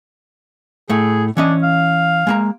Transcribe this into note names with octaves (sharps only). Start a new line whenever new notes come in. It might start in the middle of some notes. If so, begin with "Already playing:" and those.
A2 A3 G#4
E3 C#4 D4 D#5
F5
G#3 A#3 A#5